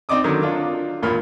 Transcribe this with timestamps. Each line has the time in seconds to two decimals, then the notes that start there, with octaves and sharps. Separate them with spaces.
0.09 C4 D#4 D5 D6 D#6
0.24 D3 D#3 F#3
0.43 D4 F4
1.02 A1 A#2 A#3 B5 F6